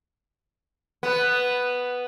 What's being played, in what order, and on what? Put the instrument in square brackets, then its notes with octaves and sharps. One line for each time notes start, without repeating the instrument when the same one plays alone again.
[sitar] B3